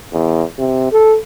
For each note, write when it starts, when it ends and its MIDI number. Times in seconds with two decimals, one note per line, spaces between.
0.13 0.43 40
0.59 0.89 48
0.92 1.17 69